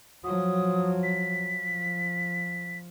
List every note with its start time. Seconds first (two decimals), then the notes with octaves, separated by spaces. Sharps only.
0.24 F3 F#3 D#6
1.03 B6
1.51 F3